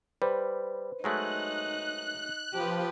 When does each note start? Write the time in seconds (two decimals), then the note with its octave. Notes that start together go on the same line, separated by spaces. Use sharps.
0.22 G3 B4 C5
1.04 F#3 G#3 A3 D#4 F#6
2.54 F3 G4 B4